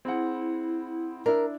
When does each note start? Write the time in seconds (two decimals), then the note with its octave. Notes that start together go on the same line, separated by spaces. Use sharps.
0.05 C4 E4 G#4 F#5
1.26 D4 E4 A#4